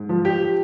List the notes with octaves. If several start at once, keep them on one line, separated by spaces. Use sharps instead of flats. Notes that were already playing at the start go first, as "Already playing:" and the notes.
Already playing: G#2
F3
G4